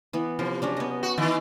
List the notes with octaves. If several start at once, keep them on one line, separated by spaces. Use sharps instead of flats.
E3 B3
C3 F3
F#3 C#4 D4
B3 D#5
F#4
D#3 E3